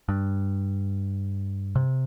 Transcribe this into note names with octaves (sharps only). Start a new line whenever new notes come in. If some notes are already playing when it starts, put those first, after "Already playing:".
G2
C3